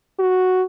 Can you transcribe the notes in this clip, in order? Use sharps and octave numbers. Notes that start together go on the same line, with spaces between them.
F#4